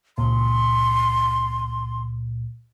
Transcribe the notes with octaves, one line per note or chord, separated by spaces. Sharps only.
C#2 A#2 C6